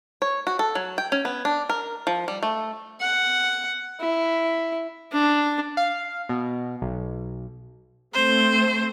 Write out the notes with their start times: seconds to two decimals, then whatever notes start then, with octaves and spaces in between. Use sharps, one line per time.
0.22 C#5
0.47 F#4
0.59 A4
0.75 F#3
0.98 G5
1.12 C#4
1.25 B3
1.45 D4
1.69 A#4
2.07 F3
2.28 G3
2.43 A3
3.00 F#5
4.01 E4
5.12 D4
5.77 F5
6.29 B2
6.82 B1
8.14 A3 C4 C5